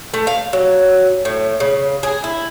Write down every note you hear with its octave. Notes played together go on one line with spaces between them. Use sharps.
A3
F5
F#3
A2
C#3
G#4
E4